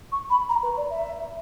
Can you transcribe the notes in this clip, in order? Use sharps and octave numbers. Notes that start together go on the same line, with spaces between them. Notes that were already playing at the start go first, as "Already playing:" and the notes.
C#6
B5
A#5
B4
D5
E5